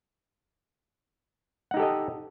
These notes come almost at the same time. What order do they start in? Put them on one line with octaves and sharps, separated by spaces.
F#5 D#4 G4 A4 D#5